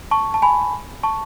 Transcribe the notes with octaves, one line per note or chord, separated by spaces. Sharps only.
A5 C#6
A5
G#5 B5
A5 C#6